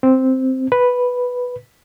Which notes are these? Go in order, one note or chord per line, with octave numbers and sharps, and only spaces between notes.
C4
B4